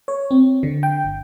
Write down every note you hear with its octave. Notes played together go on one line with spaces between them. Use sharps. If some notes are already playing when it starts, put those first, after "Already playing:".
C#5
C4
D3
G5
G1